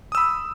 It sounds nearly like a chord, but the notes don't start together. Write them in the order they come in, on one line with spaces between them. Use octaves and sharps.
D#6 E6 B5